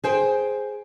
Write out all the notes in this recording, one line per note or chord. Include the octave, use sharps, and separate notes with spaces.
G#4 C5 G5